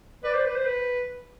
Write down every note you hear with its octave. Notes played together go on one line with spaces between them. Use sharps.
B4 D5
C5
B4
C5
B4